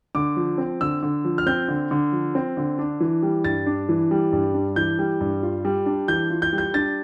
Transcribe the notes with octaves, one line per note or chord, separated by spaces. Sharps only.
D3 D6
F3
C4
D3 E6
D3
F3
F6
C4 G6
D3
D3
F3
C4
D3
D4
E3
G3
G2 A6
D4
E3
G3
G2
D4
E3 G6
G3
G2
F4
G3
D4
E3 G6
F4
G6
G3
G6
D4 A6